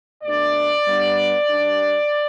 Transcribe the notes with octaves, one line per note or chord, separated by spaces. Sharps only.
B2 A3 D4 D5
G2 G3 B3 D4
G2 G3 D4